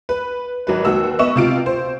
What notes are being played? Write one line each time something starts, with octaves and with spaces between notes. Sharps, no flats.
B4
G#1 F#3 B4
D#2 F#4 E6
B3 D#5 E5 C#6 E7
C3 F4 D7
C5